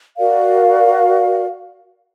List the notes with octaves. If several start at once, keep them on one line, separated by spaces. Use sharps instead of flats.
F#4 A#4 D5 F5